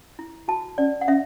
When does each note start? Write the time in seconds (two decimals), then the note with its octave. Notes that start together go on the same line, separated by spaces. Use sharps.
0.19 E4
0.48 F#4 A5
0.78 C#4 D5
1.01 F#5
1.08 C#4 E5